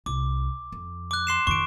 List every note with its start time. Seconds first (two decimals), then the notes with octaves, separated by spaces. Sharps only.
0.06 C2 D6
0.72 F2
1.11 D6 F#6
1.27 C6 C7 E7
1.47 F2 D#3 C#6 D7